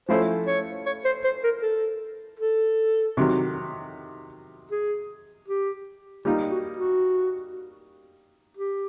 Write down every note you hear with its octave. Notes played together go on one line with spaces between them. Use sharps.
F3 A3 C#4 E4 A4 C5
C#5
C#5
C5
C5
A#4
A4
A4
C3 D#3 F#3
G#4
G4
G3 A#3 D#4 F4
F#4
F#4
G4